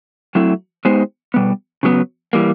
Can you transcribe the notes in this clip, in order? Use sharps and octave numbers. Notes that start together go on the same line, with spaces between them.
F#3 A3 C4 E4
G#3 B3 D#4 G4 C5
B2 G3 B3
C#3 F#3 B3
E3 G3 A#3